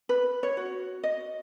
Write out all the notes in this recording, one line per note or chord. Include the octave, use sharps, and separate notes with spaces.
B4
C#5
F#4
D#5